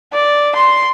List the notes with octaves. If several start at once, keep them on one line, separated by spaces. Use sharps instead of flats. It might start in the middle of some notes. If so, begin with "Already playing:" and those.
D5
C6